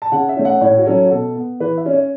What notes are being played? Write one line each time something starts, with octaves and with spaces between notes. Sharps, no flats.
A5
C#3 F#5
E5
A3 C#4
F#5
A2 C#5
F#4
F#3 C#4 A4
F#4
B2 A4
B3
E3 B4
E5
C#4
C#5